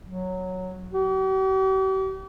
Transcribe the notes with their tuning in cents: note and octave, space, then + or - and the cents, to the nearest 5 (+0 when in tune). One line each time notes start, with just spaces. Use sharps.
F#3 -5
G4 -45